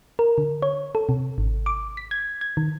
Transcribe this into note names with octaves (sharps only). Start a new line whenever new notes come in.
A#4
D3
C#5
A4
C3
G#1
D6
B6
G#6
G#6
D#3